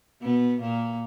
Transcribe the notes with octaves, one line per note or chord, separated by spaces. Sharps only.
B2 B3
A#2 A#3